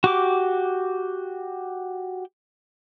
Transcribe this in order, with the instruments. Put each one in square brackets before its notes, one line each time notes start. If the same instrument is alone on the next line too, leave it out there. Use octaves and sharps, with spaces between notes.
[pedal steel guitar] F#4 G4 D6